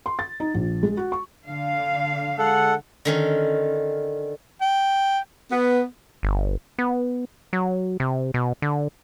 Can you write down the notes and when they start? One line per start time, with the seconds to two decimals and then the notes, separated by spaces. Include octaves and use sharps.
0.06 C6
0.19 A6
0.40 D#4
0.54 A#1
0.83 G#3
0.97 F#4
1.12 C#6
1.45 D3 F5
2.38 G#3 A4 F#5
3.05 D3 D#3 C#4
4.61 G5
5.52 B3
6.23 G1
6.79 B3
7.53 F#3
8.00 C3
8.34 B2
8.62 D3